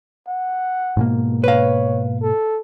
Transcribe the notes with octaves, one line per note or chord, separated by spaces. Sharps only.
F#5
G#2 B2 A#3
B4 C#5 F5
A4